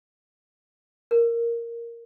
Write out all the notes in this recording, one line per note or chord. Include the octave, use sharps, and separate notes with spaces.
A#4